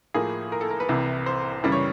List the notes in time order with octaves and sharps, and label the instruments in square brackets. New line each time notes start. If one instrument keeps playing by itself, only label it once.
[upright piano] A2 F3 A#3 G#4
A#4
A4
A#4
B4
C2 C3 E3
C5
F#2 C#3 E3 G3
C#5